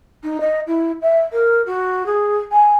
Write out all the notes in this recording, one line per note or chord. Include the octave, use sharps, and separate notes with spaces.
D#4
D#5
E4
E5
A#4
F#4
G#4
G#5